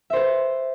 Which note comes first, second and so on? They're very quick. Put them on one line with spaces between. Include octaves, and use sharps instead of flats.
E5 C5 B4